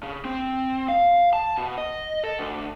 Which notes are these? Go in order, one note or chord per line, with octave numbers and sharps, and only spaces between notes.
C#3
C4
F5
A5
B2
D#5
A4
D2